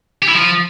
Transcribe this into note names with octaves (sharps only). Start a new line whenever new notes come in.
G4
E4
F3